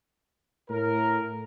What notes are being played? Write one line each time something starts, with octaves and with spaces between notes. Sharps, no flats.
A2 A#4